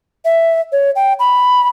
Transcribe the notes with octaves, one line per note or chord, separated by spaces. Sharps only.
E5
C#5
G5
B5